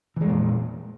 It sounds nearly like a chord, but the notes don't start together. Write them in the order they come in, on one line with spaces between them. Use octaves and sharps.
E3 G#3 F2 A#2